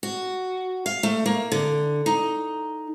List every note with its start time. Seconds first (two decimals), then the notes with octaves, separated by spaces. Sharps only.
0.03 F#4
0.86 F5
1.03 A3
1.26 A#3
1.52 D3
2.06 D#4